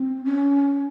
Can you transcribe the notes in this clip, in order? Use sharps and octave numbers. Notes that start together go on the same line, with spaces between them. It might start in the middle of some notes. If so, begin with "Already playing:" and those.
Already playing: C4
C#4